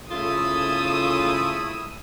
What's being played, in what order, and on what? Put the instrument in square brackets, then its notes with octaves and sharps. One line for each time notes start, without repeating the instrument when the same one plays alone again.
[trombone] C#3 [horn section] A3 E4 [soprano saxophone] F4 [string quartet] D#6 E6